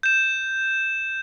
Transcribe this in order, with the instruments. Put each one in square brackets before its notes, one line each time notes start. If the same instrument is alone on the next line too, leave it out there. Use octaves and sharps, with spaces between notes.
[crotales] G6 E7